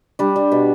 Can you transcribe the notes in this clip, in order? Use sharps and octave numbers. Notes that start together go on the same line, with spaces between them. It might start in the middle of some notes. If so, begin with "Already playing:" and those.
G3 D4
G3
B2